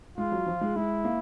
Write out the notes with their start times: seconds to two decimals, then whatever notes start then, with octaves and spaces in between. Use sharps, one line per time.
0.17 G#3 F4
0.32 F#3
0.46 F3
0.61 G#3
0.76 G#3 E4
1.05 A#3